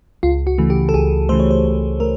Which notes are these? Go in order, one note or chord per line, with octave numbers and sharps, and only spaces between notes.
C#2 F4
F#4
C#3 E3 A3
G4
A4
C#2 G#4
C#3 E3 A3 C5
C#5
C5
C#2
A3 A#4